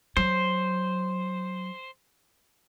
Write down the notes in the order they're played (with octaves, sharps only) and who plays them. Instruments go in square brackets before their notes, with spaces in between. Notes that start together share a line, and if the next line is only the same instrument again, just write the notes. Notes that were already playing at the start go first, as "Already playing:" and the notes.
[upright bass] F#3 [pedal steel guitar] C5